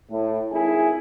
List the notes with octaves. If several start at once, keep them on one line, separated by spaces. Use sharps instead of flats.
A2
G#1 E4 G#4 G#5